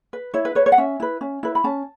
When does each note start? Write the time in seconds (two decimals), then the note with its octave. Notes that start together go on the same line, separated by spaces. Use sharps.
0.13 B4
0.34 E4 C#5
0.45 B4
0.55 B4 C#5
0.66 C#5
0.72 F#5
0.78 C#4 E5
1.00 E4 B4
1.21 C#4
1.43 E4 B4
1.55 B5
1.64 C#4 A5